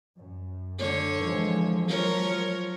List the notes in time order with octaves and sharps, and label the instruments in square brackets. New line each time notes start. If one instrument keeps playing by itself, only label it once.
[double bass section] F#2
[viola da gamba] D3 C#5
[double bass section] E3 F3 G#3
[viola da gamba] F3 A#4 C#5 [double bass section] F#3